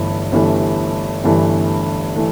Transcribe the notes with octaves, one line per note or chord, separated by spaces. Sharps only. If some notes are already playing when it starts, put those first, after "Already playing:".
Already playing: G1 G2 E3 A3
G1 G2 E3 A3
G1 G2 E3 A3
E3 A3